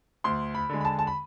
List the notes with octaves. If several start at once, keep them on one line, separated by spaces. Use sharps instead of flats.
D2 C6
B5
D3 G#3
B5
A5
A5
B5